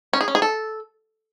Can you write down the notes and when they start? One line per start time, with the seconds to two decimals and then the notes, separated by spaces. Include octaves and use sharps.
0.13 C#4
0.21 G#4
0.28 C#4
0.35 G#4
0.42 A4